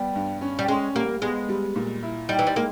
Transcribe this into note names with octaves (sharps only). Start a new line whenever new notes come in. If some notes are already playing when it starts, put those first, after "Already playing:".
Already playing: G3 B3
G2
C#4
G3
G#3 C#4
G3 A#3
G#3 B3
G3
A#2
E4
G3 D#4
E3
G3
G#3 A#3